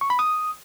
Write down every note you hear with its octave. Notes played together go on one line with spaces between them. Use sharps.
C#6
B5
D#6